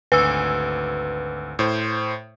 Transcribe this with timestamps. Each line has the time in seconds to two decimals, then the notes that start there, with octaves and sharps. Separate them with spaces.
0.12 G#1 D2 B4 E6
1.59 A2 C5